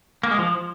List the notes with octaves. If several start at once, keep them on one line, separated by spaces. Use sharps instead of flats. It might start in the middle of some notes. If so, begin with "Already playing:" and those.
A#3
G#3
F3